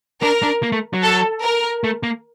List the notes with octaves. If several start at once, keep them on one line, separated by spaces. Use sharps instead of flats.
D4 A#4
D4
A#3
A3
F#3
A4
A#4
A3
A#3